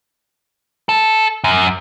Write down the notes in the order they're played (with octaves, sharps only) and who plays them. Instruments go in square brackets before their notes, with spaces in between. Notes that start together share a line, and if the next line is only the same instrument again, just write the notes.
[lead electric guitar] A4
F#2